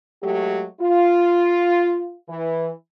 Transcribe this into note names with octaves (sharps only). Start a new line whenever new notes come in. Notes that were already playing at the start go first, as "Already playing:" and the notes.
F#3 G#3 A3 G4
F4
E3